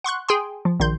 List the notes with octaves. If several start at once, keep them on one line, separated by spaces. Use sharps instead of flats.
F#5 C6 C#6 F#6
G#4 G5 G#5 C6
F3
A#1 D#3 C6 G6